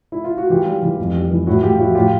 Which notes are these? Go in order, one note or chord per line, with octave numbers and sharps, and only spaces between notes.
E4
F4
F#4
E3 F4 G4
G3
E3
F2
G3
E3
A2 E4 F#4
A2 F4 G4
F3 E4 F#4
A2 F4 G4